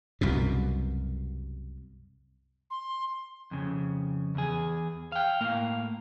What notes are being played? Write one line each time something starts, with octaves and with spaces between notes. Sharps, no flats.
C2 F#2 B2
C6
F2 C#3
E2 G#4
F5 G5
A2 A#3 F5